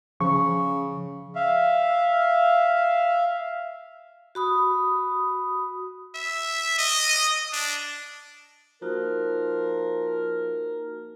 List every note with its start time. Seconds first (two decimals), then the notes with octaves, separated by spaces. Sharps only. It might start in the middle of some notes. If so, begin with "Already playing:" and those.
0.21 C#3 F3 C#6
1.35 E5 F5
4.35 F#4 B5 D#6
6.15 E5
6.78 D#5
7.53 D4
8.82 F3 A#3 D#4 F#4 A#4